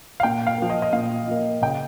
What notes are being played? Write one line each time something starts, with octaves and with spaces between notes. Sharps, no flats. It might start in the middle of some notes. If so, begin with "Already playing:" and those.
F5
A#2 G5
F5
F3 A#3
D#5
D#5
A#2 F5
F3 A#3
C#3 G5